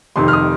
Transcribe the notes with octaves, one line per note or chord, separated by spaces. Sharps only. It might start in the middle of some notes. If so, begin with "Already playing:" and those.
F1 F2 C3 D#3 C6
F6
D#6